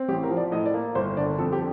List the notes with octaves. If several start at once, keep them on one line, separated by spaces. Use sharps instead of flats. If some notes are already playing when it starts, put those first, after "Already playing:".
Already playing: C4
A1 G4
A#4
F3
D5
A2 D#5
D5
A#3
G1 C5
D3 D5
F2 A4
G4